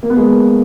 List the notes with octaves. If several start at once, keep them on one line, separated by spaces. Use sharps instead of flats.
A#3
B3
G#3 A#3